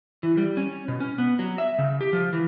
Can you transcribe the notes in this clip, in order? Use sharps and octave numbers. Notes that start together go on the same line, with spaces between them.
E3
G3
C#4
B2
C#4
B3
F#3
E5
C#3
G4
F3
E3